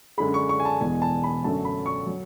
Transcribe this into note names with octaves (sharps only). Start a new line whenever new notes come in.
F#2 D3 G#3 B5
C#6
C#6
G#5
A5
E1 E2 B2 G#3 G#5
A5
B5
F#2 D3 F#3 A3 A5
B5
C#6
F#3